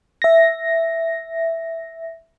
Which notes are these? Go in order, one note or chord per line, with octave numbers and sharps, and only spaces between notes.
E5 A#6